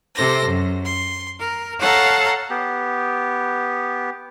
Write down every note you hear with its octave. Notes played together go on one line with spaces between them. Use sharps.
C3 A4 C5 A#6
F#2
C6
A#4
A4 C#5 F5 F#5 A5 A#5
B3 G4